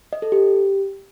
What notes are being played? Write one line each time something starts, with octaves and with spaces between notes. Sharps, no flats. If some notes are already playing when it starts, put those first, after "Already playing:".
D#5
A4
G4